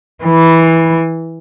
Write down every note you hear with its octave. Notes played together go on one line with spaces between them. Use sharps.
E3